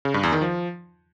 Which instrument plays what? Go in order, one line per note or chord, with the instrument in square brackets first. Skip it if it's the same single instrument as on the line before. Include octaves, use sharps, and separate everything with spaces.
[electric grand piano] C#3
G2
E2
D#3
F3